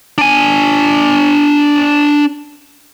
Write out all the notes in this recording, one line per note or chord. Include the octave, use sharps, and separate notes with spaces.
D4 G#5